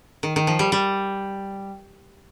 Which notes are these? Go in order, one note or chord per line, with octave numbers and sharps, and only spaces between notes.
D#3
D#3
F3
G3
G3